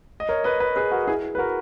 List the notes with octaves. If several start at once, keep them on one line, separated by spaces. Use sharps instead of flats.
D#5
A#4 C#5
B4 D#5
B4 D#5
G#4 B4
F#4 A#4
E4 G#4
B4
F#4 A#4